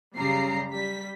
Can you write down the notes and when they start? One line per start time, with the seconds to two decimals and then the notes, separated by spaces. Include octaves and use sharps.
0.15 F#2 C#3 G3 A#5 C7
0.70 G3 B6